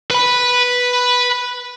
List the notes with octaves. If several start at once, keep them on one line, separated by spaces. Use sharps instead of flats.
B4 B5